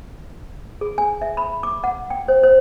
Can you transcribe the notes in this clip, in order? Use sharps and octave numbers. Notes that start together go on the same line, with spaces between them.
G#4
G#5
E5
B5
D6
F#5
G5
C5
C5